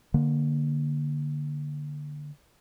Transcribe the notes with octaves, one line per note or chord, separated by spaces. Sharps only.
D3 A#3